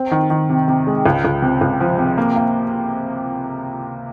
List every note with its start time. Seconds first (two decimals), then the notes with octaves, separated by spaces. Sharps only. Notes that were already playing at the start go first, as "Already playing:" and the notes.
Already playing: C4
0.11 D#3
0.30 D#3
0.50 C3
0.68 C3
0.87 G#3
1.06 C#2
1.25 C#2
1.42 C3
1.61 C#2
1.80 F3
1.98 C3
2.18 A#3
2.36 A#3